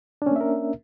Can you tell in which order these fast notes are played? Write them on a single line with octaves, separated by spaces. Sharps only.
D4 C#4 A#3 E5 A#4